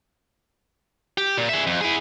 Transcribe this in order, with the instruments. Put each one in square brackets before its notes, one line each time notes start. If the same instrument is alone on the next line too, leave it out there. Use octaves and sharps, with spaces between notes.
[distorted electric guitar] G4
A#2
G#4 E5
F2
E4 G#4